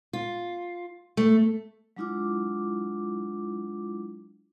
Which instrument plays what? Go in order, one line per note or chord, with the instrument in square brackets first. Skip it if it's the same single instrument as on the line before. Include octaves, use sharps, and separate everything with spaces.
[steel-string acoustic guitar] F4
A3
[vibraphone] F#3 G#3 D4 E4 F4 D6